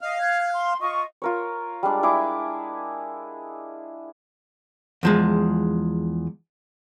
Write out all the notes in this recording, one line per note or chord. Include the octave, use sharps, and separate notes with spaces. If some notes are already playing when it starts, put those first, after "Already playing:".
D#5 F5
F#6 G#6
C6
F4 D#5 C#6
F4 A#4 C#5
G3 G#3 D4 D5
E4 G#4 E5 D6
E2 F3 G#3